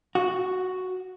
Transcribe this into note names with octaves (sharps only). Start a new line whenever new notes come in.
F#4